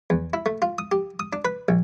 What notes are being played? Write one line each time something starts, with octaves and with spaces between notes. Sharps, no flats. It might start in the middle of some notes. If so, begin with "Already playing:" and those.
E2
E4
A3
F4
D#6
G4
D#6
D4
B4
A#1